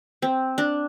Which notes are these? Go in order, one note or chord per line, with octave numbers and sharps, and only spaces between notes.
C4
D4